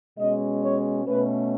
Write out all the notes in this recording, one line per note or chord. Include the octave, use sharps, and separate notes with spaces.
B2 G#3 C#4 D#5
C#5
B2 A3 C#4 B4